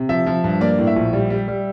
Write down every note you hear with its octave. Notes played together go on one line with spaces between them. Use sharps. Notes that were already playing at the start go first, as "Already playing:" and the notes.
Already playing: C3
F3 E5
F3
G2
A#3 D5
A2
E5
A#1
G3
G3
G3